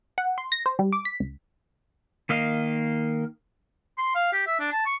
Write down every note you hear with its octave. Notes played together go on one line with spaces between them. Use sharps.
F#5
C6
A#6
C5
G3
D6
B6
C#2
D#3 A#3 D#5 F5
C6
F5
G4
E5
D4
A5
C#6